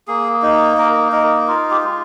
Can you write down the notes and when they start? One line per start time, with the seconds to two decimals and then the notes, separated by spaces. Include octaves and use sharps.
0.08 A#3 G#4
0.42 D#4
0.77 A#3 A#4
1.12 D#4 A#4
1.48 F4 A#4
1.71 G4
1.83 G#3